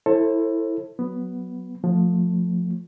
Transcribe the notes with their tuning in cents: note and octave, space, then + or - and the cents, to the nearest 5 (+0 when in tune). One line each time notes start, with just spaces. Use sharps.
E4 +0 A4 +15 C5 +30
F#3 +0 B3 +0
F3 +20 A3 +20